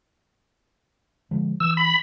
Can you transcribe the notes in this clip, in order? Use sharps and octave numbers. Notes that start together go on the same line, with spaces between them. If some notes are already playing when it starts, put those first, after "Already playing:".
D3 F3 G#3
E3 E6
B5